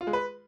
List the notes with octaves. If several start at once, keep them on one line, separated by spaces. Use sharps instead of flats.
F4
G#3
B4